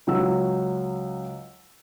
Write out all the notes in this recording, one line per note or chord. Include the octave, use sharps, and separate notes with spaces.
C#2 F#3 E6